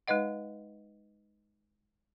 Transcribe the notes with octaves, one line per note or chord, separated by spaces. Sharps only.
G#3 D#4 B4 D#5 F#5